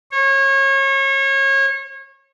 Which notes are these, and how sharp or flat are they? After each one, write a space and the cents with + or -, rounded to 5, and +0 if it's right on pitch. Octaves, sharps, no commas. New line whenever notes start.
C#5 -30